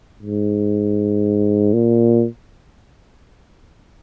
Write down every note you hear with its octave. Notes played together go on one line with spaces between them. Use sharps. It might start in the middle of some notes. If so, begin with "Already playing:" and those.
G#2
A#2